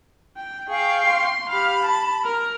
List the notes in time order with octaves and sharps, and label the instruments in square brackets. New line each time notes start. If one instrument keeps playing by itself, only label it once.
[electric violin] G5
[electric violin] G#4 [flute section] F5 G5 C#6
[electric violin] C6
[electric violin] G4 F5 [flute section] B5
[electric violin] A5
A#4